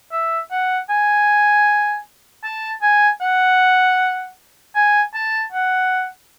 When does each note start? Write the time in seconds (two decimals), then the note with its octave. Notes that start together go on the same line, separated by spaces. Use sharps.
0.12 E5
0.51 F#5
0.89 G#5
2.44 A5
2.82 G#5
3.21 F#5
4.75 G#5
5.14 A5
5.52 F#5